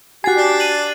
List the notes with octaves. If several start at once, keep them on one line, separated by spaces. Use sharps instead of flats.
F#4 G4 G#5 F#6 A6 C7
D4
D#7 F#7